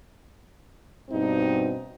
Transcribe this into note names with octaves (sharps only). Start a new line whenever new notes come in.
G2 B2 C4 D#4